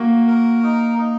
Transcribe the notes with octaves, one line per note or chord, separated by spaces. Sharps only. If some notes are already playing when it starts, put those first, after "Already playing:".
Already playing: A#3 F#4
A#4
D#4
D#4